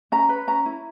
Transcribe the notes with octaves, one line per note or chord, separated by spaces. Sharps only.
C#4 A#5
B4
C#4 A#5
E4